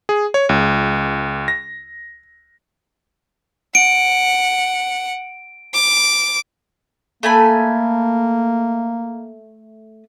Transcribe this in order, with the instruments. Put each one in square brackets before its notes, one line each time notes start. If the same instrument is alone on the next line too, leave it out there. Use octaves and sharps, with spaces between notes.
[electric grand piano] G#4
C#5
C#2
A#6
[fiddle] F#5 [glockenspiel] D7
[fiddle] D6
[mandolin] A3 G#5 B5 [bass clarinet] A#3